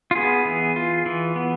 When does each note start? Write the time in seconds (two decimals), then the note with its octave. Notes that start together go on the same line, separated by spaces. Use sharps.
0.11 F4
0.15 B3 G#4
0.45 E3
0.76 F4
1.06 E3
1.36 B3